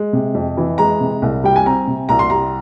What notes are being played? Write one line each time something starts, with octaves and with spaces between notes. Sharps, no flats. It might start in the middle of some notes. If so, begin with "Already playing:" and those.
Already playing: G#3
C3
F2
E3
G#3 A#5
C3
C2
G3 G5
G#5
C4 A#5
C3
C2 A#5
C6
G3 A#5